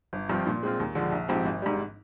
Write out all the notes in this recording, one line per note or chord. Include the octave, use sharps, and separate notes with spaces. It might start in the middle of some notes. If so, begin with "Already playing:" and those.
G1
G2 F3 C4 F4
A#2
G#3 C4 F4
D#2
D3 F3 G#3
A#1
G#2 F3 C4 G4
G#1
G#2 G3